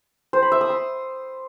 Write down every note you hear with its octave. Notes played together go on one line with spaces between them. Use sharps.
C5
B5
E5
D#6
C6